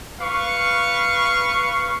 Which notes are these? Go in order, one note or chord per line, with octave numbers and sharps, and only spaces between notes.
B4 F5 C#6